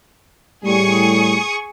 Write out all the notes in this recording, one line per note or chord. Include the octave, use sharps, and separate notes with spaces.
A2 G3 G#4 C#6 D#6